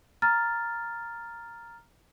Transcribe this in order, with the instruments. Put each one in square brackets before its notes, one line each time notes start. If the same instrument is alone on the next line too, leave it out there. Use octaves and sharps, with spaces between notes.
[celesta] A#5 F6 A6